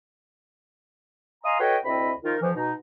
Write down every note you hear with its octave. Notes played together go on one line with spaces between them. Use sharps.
D#5 F5 G#5 A#5 C6 D#6
F#4 A4 B4 C#5 D#5 G5
D2 C3 C4 E4 D#5 B5
D#3 F3 D#4 F4 A#4
F2 E3 F3
B2 D#4